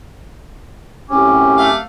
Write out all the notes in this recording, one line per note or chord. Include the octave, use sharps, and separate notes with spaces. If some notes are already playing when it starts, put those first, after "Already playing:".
F#2 A2 C4 C#4 G4 D6
A3 F5